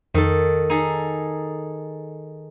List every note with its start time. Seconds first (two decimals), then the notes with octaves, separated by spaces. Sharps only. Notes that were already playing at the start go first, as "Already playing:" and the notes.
0.14 F2 D#3 A4
0.70 D#4 G#4 A4